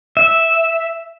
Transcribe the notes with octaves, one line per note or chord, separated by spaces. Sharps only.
E5